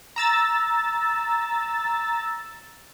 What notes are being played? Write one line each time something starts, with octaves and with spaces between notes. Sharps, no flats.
A#5 E6 A6